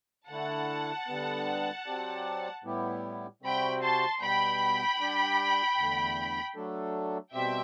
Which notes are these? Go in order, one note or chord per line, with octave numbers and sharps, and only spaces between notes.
D3 A3 E4 F#5 A5
D3 G3 B3
F#3 C4 G4 D5
A2 G3 B3 E4 G4
C3 G3 C4 F#4 C5 G5 B5
A5 C6
B2 G3 B3 G5 B5
G3 D4 G4 D5
E2 D3 A3
F#3 A3 D4 A4
B2 G3 C4 G4 C5 E5 G5